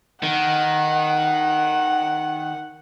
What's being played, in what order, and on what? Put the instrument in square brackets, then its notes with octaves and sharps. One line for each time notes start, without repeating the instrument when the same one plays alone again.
[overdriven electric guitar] D#3 [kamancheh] F#5